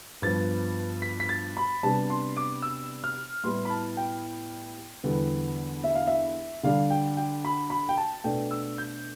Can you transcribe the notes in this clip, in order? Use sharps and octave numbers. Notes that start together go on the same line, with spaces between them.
G2 F3 B3 A6
B6
B6
A6
B5
C3 G3 B3 D4 A5
C6
D6
E6
F6
A2 G3 B3 E4 C6
B5
A5
G5
E2 D3 G3 B3
E5
F5
E5
D3 G3 D4 F5
G5
G5
B5
B5
G5
A5
B2 A3 D4 G5
E6
G6